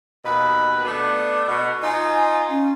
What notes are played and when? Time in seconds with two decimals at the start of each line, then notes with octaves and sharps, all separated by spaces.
0.24 D#2 B2 B4
0.85 A3 B3 D4
1.48 B2
1.83 D#4 F4 G#5
2.49 C#4